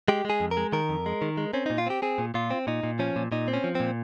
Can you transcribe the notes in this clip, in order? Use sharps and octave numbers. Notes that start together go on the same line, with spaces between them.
G#3 G4
G#3 G#4
F2
A#4
G#3
D#3 A#4
F2
G#3
D#3
G#3
C4 C#4
A#2 D#4
F4
C4 G4
C4 G#4
A#2
A#2 F4
C4
A#2 D#4
A#2
F3 C#4
A#2
A#2 D#4
C4
C#4
F3
A#2 C4